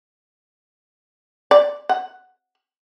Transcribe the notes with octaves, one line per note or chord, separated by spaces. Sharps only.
D5
F#5